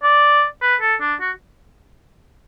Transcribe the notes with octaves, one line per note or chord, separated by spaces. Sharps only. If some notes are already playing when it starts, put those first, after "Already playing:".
D5
B4
A4
D4
F#4